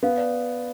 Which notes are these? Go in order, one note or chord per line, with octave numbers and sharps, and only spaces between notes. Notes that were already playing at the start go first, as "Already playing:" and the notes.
B3 F5
D5